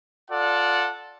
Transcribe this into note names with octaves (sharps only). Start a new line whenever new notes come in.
F4 A4 D5 F#5